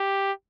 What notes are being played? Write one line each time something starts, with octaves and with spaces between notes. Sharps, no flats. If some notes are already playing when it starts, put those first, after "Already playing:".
Already playing: G4